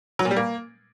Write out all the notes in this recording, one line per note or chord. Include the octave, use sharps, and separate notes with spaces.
F#3
A#2
G3
A#3